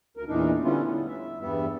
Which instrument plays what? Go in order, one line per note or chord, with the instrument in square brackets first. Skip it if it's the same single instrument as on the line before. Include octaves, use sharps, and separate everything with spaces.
[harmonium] D2 A#4
E2 A#2 E3 D4 D#4
D3 G3 B3 C#4 E4 F4
A2
E5
E2 G2 G3 B3 E5